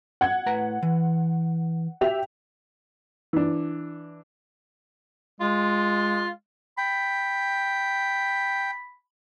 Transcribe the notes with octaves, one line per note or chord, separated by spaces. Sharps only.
F#5 G#6
A2 B4 A#5
E3
G4 E5 F7
E3 D4
G#3 F4
G5 B5